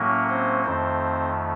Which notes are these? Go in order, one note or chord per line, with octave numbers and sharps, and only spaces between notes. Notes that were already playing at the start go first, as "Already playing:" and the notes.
Already playing: A2 F#3 A#3 C#4 A#4
C4 C5
F2 D#3 A3 C4 C5